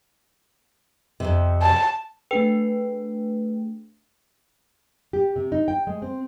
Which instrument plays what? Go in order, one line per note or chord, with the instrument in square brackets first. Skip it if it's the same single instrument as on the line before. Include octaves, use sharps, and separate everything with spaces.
[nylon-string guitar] F2 C3
[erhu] A5
[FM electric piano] A3 D4 G#4 [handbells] B4 G5
[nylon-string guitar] G4
C3
D#4
G5
G#3
C4